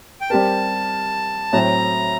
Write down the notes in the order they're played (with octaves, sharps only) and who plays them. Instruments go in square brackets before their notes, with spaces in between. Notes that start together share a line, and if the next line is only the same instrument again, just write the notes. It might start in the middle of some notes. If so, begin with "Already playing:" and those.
[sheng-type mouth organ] G5
[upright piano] G3 C4 G4 A#4 [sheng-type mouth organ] A5
[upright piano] A2 F#3 C4 [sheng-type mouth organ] A#5